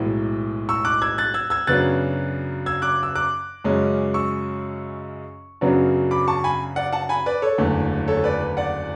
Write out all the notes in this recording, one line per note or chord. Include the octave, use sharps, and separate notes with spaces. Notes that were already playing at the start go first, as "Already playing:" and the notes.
Already playing: B1 A2 E3 G#3
C#6 E6
D6 F#6
E6 G#6
F#6 A6
E6 G#6
E6 G#6
F#2 C#3 F#3 B3 D4 F#6 A6
E6 G#6
D6 F#6
E6
D6 F#6
F#2 C#3 G#3 C#4
C#6 E6
F#2 C#3 F#3 B3 D4
B5 D6
A5 C#6
G#5 B5
D5 F#5
F#5 A5
G#5 B5
B4 D5
A4 C#5
F#1 E2 D3 A3
A4 C#5
B4 D5
B4
D5 F#5